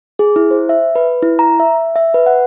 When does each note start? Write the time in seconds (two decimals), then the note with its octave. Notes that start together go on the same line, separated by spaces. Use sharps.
0.19 G#4
0.36 E4
0.51 C5
0.69 E5
0.96 B4
1.23 E4
1.39 A#5
1.60 E5
1.96 E5
2.14 B4
2.26 F#5